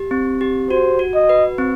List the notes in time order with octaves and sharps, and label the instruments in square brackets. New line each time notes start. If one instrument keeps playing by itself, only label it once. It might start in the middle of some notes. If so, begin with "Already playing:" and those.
Already playing: [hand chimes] G4
C4
G4
[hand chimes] F#4 [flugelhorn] C5
[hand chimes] F#4
[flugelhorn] D#5
[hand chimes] B4
C4